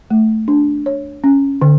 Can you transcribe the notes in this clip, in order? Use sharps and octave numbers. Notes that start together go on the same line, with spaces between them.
A3
D4
C#5
C#4
D3